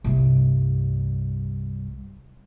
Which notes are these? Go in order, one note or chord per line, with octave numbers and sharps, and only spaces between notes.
C2 G2